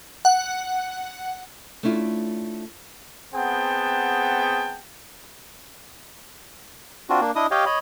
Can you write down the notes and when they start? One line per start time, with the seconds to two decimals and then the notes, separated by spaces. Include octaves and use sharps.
0.25 F#5
1.83 A3 C#4 D4 E4 F4
3.34 B3 C4 G#4 F#5 G5 A5
7.10 C4 D4 F4 F#4
7.21 A#3 D4
7.36 D4 E4 D#5 D#6
7.51 G4 C#5 D#5 F5 G5
7.66 C#5 D#5 B5